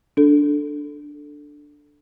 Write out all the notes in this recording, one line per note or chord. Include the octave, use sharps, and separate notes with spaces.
D4 A4